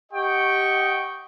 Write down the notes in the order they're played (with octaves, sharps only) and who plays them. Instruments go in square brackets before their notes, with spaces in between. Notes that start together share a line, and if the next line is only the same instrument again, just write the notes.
[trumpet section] G4 D#5 F#5 G5 C#6